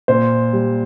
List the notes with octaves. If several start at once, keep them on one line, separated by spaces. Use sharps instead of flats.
A#2 C5
G3